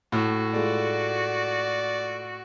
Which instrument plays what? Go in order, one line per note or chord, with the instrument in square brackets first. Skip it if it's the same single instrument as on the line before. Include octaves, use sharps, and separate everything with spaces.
[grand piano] A2 [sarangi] F#4
[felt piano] G#3 A3 F4 [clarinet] D5